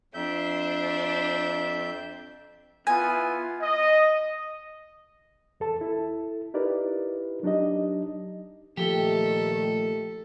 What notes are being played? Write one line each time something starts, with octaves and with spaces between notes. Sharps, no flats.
F2 D4 C5 E5 G6
B3 E4 F4 G#5
D#5
E2 A4 A5
E4 A4
D#4 E4 G4 A#4 B4 D5
F#3 D4 D#4 G4 D#5
A#2 D#3 F3 A3 G4 A4